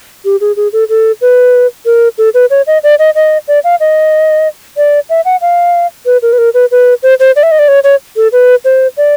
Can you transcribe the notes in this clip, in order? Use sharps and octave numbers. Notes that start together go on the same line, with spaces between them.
G4
G#4
G#4
A4
A4
B4
A#4
A4
B4
C#5
D#5
D5
D#5
D#5
D5
F5
D#5
D5
E5
F#5
F5
B4
A#4
B4
A#4
B4
B4
C5
C5
D5
E5
D#5
D5
C#5
C#5
A4
B4
C5
D5